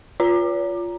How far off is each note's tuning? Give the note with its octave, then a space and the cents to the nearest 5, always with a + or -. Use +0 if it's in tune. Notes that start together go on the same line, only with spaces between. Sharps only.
F4 +0 C#5 +45 A#5 +0